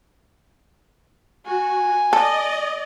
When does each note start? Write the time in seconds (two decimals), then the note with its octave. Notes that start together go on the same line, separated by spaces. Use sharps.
1.46 F#4 G#5
2.13 A4 D5 D#5